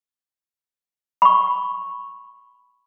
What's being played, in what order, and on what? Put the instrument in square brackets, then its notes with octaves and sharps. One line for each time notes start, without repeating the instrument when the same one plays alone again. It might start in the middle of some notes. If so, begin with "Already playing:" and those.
[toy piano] B5 C#6